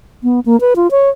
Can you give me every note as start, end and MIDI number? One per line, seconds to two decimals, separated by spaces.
0.23 0.40 59
0.46 0.59 58
0.61 0.74 71
0.76 0.90 65
0.91 1.10 73